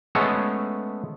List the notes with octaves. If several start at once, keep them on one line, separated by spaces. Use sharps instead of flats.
G#3 A3 B3 C#4 A4 C#5